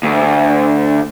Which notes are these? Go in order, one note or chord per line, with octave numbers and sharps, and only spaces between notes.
D2